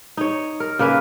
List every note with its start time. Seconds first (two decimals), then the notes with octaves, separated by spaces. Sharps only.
0.17 D#4 C#5
0.60 A#4
0.79 C#3 A#3 A#4 B4